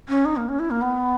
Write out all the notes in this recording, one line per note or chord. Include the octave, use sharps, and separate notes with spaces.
C#4
D#4
A#3
C#4
E4
A#3
B3